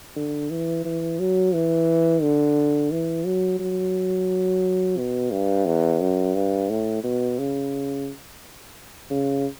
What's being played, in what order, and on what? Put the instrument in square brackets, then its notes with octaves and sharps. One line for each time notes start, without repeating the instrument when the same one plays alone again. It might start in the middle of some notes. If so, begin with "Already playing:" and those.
[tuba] D3
E3
E3
F#3
E3
D3
E3
F#3
F#3
B2
G2
E2
F#2
G2
A2
B2
C#3
C#3